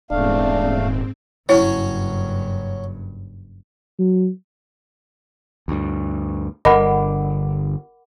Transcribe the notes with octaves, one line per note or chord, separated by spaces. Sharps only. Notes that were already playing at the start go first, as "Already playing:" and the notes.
D#1 E2 G#2 A3 C4 D4 F5
F#1 G2 F#3 C#4 E4 C#5
F#3
D2 G2
G1 D3 A#4 D#5 F#5 B5 D6